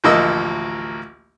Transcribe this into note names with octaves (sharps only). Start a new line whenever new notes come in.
A1 D2 F3 A#3 D#5 E6